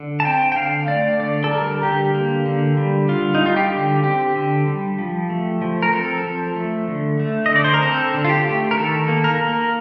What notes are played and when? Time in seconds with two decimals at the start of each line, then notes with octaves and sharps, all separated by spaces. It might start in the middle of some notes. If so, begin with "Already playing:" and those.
Already playing: D3
0.20 A5
0.25 C4 G5
0.52 G5
0.56 D3 F5
0.88 A3 D5
1.20 D3 D5
1.44 A4
1.51 G3 A#4
1.83 D3 G4
2.14 A#3
2.46 D3
2.77 G3
3.09 D3 F4
3.35 D#4
3.40 G3
3.46 F4
3.56 G4
3.72 D3
4.04 C4 G4
4.36 D3
4.67 G3
4.98 F3
5.30 A3
5.62 F3
5.83 A#4
5.93 C4 A4
6.24 F3
6.56 A3
6.88 D3
7.20 A3
7.46 D#5
7.51 D3 D5
7.64 C5
7.74 A#4
7.82 C4 A4
8.14 D3
8.25 F4
8.29 G4
8.45 A3
8.71 A#4
8.77 D#3 A4
9.08 A#3
9.24 A#4
9.40 A#3